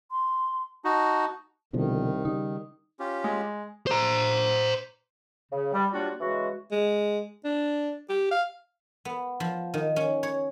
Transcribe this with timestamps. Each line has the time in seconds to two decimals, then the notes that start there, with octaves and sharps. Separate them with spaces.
0.11 C6
0.85 D#4 F#4 A5
1.73 C2 B2 D3 D#3 F3
2.25 C#3 G3 D#4
2.99 C#4 F4 G4
3.24 G#3
3.87 C5 A#5
5.52 C#3
5.74 G3
5.93 F#3 G3 A#3 D4 F4 F#4
6.20 C#3 E3 G#3 F#4
6.72 G#3
7.44 D4
8.09 G4
8.31 F5
9.05 B3
9.40 F3
9.74 D#3
9.96 C#4
10.23 C#5